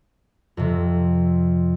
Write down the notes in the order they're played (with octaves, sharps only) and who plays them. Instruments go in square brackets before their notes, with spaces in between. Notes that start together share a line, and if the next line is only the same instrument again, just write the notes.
[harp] F2 C3